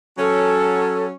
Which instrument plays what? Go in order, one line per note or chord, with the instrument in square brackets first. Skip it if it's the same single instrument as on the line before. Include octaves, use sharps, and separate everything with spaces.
[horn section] F#3 C#4 [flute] A4